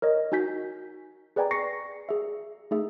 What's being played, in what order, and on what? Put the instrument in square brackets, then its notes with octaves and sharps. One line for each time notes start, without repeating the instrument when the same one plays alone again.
[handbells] A#4 C#5 D#5
D#4 F#4 G#5 G6 B6
G#4 B4 D5 G5 G#5 A#5
C#6 A#6 C7 C#7
G#4 E5
A3 D#4 G#4 E5